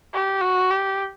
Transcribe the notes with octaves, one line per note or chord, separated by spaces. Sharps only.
G4
F#4
G4